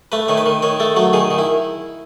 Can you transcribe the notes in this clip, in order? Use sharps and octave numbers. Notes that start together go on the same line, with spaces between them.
A3 B4
D#3 C#5
B4
D#3
D#3 C#5
A3 A4
F#3 A4
D#3 G#4
D#3
E4